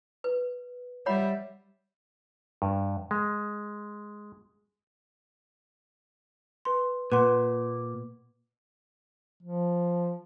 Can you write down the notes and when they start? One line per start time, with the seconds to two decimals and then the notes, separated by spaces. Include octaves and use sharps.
0.24 B4
1.06 G3 C#5 E5 F#5 B5
2.62 G2
3.11 G#3
6.65 B4 C6
7.12 A#2 B4 F#5 C6
9.43 F3